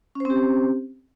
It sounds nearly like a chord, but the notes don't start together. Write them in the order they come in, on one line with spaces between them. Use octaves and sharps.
C#4 C5 C4 G4